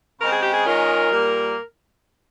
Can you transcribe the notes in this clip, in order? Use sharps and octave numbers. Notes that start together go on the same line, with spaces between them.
C#3 G#3 C4 A#4
G#4
G4
G#4
D#3 G#3 C#4 F4 A#4
A#2 G3 A#3